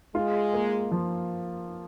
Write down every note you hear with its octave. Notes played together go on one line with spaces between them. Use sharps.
G#3 F4
A#3
F3